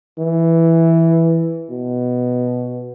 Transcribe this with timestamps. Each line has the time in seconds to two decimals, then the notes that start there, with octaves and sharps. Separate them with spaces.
0.18 E3
1.70 B2